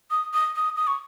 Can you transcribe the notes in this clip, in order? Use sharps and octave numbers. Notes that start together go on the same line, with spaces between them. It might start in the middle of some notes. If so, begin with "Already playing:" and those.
D#6
D#6
D#6
D#6
C#6